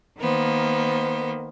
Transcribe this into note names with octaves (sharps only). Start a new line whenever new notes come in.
D#3 A#3 B3 C5